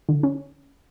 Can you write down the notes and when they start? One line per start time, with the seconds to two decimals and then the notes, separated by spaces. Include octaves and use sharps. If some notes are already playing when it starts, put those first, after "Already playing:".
0.09 D3
0.23 C#4